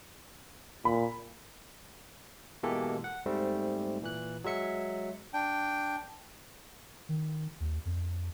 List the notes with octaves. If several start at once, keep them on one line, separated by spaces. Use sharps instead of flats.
A#2 B5
B2 E3 G#3 A#3 G4 A4
F#5
G#2 G3 A3 C4
A#2 E3 F#6
F#3 G#3 E5 C#7
D4 G5
D#3
D#2
F2